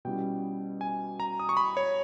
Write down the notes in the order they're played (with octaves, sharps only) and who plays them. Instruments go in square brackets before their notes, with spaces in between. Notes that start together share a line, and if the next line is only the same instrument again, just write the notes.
[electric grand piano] B2 G3 C#4 E4 G5
G#5
A#5
D#6
C#6
B5
C#5